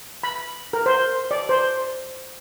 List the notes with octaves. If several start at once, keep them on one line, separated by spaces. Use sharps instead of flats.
B5
A#4
C5
D5
C5